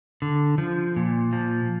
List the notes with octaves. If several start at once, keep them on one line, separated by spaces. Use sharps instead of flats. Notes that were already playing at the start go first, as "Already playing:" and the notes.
D3
F3
A#2
F3